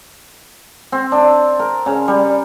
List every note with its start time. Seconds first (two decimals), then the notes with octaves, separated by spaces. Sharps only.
0.92 C4
1.12 D4
1.59 A#4
1.86 C#3
2.08 G3